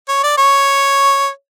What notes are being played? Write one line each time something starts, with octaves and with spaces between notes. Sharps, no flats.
C#5
D5
C#5